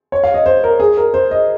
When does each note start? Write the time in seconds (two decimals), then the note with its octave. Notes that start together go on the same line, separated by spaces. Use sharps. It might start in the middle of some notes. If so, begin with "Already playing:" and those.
0.12 C#5
0.24 F5
0.34 D#5
0.46 C5
0.64 A#4
0.80 G#4
0.97 A#4
1.14 C5
1.31 D#5